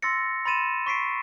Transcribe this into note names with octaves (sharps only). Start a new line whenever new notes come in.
C6 E6 A6 A#6 C#7
B5 C6 A6 D#7 E7
C#6 B6 C7 D7